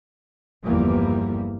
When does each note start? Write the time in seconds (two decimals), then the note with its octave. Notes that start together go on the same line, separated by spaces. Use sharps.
0.65 G1 E2 E3 F3 G3 A#3